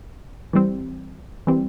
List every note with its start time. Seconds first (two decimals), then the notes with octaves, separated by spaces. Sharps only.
0.53 E3 G3 C4
1.47 E3 G3 C4